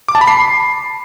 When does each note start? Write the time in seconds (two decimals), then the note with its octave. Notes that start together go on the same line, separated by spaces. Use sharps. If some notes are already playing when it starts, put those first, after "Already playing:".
0.08 D6
0.15 A5
0.21 B5
0.28 C7